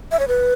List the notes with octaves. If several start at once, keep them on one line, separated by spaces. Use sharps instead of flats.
E5
C#5
B4